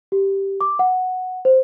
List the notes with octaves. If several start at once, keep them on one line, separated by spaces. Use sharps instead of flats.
G4
D6
F#5
C5